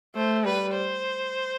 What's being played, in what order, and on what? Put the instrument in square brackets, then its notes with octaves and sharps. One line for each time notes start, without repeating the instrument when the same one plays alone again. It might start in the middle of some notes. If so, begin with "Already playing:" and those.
[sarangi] A3 [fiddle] C5
[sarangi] G3 [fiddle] B4
[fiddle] C5